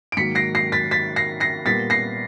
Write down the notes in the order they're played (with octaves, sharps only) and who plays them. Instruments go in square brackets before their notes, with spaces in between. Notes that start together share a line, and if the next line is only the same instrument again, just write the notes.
[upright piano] D7
G#2 D#3 F#3 A#3 B6 C#7
A#6 C7
A#6 C7
A6 B6
A6 B6
A#6 C7
A#6 C7
A#2 G3 B3 A6 B6
A#6 C7